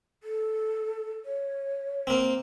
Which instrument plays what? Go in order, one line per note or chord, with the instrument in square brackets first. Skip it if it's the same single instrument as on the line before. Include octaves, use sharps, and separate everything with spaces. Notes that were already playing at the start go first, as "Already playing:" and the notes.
[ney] A4
C#5
[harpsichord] A#3 C4